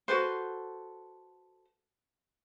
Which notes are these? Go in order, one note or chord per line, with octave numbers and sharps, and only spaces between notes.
F#4 A4 B4 C5